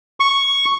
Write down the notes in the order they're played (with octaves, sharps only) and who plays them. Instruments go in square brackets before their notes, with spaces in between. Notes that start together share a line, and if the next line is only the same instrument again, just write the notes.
[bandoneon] C#6